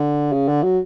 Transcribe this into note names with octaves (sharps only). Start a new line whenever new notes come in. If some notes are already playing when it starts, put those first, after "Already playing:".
Already playing: D3
C#3
D3
F#3